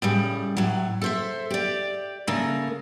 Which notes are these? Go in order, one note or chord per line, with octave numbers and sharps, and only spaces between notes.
A2 C#3 G3
A2 F#3
A4 C5 E5
G4 D5
C#3 A3 A#3 A#4